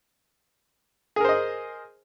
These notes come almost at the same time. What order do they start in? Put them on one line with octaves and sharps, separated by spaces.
G#4 A#4 C5 D#5